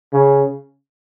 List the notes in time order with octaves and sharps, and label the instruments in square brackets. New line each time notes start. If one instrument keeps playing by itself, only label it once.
[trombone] C#3